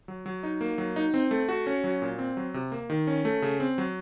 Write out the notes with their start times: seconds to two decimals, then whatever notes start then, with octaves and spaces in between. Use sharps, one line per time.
0.08 F#3
0.26 F#3
0.43 D#4
0.61 A#3
0.78 F#3
0.96 D#4
1.14 C4
1.31 A3
1.49 F#4
1.67 C#4
1.84 F#3
2.02 A#2
2.19 C4
2.37 F#3
2.54 C3
2.72 A#3
2.90 D#3
3.07 C#4
3.25 A3
3.42 C#3
3.60 C4
3.78 F#3